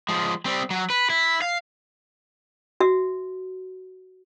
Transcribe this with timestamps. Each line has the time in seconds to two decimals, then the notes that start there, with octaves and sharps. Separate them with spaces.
0.09 F3 G#3
0.45 G3 C4
0.70 F#3
0.90 B4
1.10 E4
1.42 F5
2.80 F#4 E5